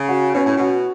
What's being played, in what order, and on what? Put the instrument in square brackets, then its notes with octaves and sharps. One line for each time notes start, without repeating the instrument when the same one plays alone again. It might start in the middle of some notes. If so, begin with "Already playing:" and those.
Already playing: [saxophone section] C#3
[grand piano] F#4
[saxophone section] B2 [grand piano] C#4
[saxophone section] A2
[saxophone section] B2 [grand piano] F#4